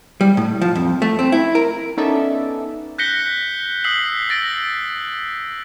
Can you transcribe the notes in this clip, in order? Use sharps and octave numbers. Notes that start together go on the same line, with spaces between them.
G3
A2
F3
F2
A3
C4
E4
A#4
B3 C#4 D#4 A4 D5 E5
F#6 G6 A#6 B6 C#7 G7
D#6 E6 F#6 B6 C7 F#7
E6 A6 A#6 C7 D7